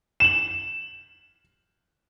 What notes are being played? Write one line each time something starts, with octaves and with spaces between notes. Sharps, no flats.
E7 F#7